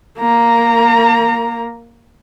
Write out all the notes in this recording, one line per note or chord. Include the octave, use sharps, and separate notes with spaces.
A#3 A#5